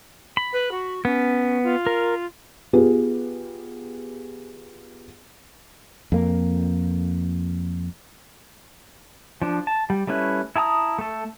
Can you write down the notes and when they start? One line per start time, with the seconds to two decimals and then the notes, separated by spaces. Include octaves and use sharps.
0.37 B5
0.52 B4
0.71 F#4
1.05 B3 C#4
1.63 F4
1.87 A#4
2.73 B3 F4 G4 G#4
6.12 F2 A#3
9.42 F3 D4
9.67 A5
9.90 G3
10.07 G3 A3 C#4 E4 B4
10.56 E4 G#4 A5 A#5 D#6
10.99 A3 A4